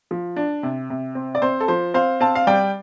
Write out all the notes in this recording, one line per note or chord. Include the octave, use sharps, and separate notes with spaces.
F3
D4
C3
C3
C4
D5
C4 C5
A4
F3 C5
C4 C5 F5
C4 F5 A5
F5
G3 D5 G5